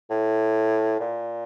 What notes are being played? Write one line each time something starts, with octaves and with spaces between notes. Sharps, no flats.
A2
A#2